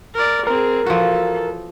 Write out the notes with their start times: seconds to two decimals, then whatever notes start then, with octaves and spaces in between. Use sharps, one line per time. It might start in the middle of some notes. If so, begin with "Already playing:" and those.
0.15 A#4 D5
0.47 C4 G#4 A#4
0.86 E3 F3 F#4 A4